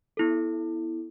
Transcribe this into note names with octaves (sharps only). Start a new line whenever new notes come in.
B3 E4 A4